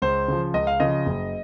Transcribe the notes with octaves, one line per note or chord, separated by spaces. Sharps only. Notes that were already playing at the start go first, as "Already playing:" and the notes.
C#2 C5
C#3 F3
C#2 D#5
F5
C#3 F3 D#5
F#1